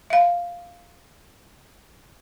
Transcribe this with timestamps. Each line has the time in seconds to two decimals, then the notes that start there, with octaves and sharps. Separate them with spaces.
0.10 E5 F5